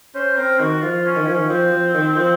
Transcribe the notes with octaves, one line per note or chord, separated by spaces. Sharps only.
C#4 C5
C4 A#4
D#3 F#4
F3 F4
C#4
D#3
F3 C#4
D#3
F3 C4
F3
D#3
F3